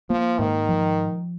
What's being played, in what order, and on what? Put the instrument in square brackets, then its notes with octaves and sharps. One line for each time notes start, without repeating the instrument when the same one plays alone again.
[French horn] F3 [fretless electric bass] A#3
[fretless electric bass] G#2 [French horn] D#3
[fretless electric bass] F3